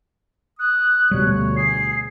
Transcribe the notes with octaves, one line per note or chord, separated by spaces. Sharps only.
D#6 F#6
D2 B2 G3 C#5
G#4 C7